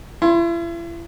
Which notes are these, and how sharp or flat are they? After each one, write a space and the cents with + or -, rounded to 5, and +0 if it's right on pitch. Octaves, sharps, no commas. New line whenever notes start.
E4 +40 C6 +20